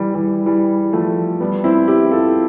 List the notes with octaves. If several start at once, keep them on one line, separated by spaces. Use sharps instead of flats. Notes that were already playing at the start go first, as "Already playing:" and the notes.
Already playing: E3 G3
E3 G3
E3 G3
F3 A3
G3 B3
C4 E4
E4 G4
F4 A4